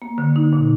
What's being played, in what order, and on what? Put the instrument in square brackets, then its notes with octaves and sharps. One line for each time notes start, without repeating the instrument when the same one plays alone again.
[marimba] A#3
D3
D#4
A#2